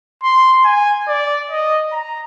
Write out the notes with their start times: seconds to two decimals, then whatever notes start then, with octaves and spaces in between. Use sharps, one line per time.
0.23 C6
0.65 G#5
1.08 D5
1.50 D#5
1.93 A#5